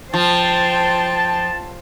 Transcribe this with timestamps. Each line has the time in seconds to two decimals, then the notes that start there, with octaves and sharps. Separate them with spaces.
0.14 F3 C5 G5 A5